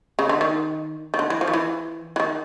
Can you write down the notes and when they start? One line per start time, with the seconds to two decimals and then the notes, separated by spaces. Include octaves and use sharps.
0.19 C#3
0.29 D3
0.41 D#3
1.14 D#3
1.19 D3
1.30 E3
1.41 F3
1.48 D#3
1.53 E3
2.16 E3
2.20 D#3